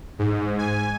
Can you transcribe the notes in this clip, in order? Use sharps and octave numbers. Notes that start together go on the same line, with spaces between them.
G#2
G#5